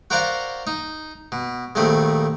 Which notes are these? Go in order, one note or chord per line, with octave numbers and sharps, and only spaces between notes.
F#4 A#4 C5 D5 F5 F#5
D#4
B2
A#1 D#2 D#3 A3 C4 B5